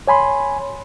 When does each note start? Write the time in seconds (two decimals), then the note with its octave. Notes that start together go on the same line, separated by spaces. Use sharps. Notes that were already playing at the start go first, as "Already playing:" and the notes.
0.07 C#5 G#5 B5 C6